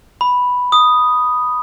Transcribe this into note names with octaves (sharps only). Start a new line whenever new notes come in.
B5
D#6